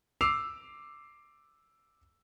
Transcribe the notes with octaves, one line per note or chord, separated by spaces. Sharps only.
D6 E6 C7 F7